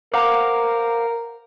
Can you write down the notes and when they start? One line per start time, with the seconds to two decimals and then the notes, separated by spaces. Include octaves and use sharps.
0.14 A#4 C5 F5 F#5 A#5 D6